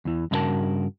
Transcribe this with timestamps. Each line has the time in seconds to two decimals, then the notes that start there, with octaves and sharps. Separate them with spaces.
0.05 E2 E3
0.31 G2 C#3 E4 F#4 A#4 A5